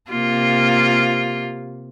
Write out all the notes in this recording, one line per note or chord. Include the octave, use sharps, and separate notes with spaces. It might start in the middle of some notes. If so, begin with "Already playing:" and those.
C3 A#3 F4